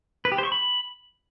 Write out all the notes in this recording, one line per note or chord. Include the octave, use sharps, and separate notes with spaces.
B4
G4
C5
C#6
B5